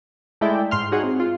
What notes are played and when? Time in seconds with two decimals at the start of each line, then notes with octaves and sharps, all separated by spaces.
0.41 G#3 A3 E4 A4 D5 G5
0.71 G#2 C6 F6
0.92 D#4 F#4 G#4 C#5 F#5
1.03 C4
1.20 F4